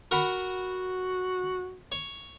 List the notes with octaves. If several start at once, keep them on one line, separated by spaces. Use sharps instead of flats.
F#4 A#4 F#5 B5
C#5